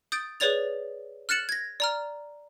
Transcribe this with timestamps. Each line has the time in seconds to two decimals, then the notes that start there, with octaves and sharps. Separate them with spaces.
0.12 D#6 G6 A6 D7
0.40 G#4 B4 C#5 D5 A6 F7
1.29 F6 F#6 A6 C#7 E7 F#7
1.49 G#6 A#6
1.80 D5 A#5 F6